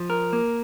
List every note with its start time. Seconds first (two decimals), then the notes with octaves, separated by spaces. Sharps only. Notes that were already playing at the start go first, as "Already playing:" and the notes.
Already playing: F3
0.10 A#4
0.33 A#3